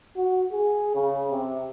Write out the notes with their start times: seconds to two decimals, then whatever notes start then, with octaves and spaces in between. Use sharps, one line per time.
0.16 F#4
0.52 G#4
0.95 C#3
1.30 C3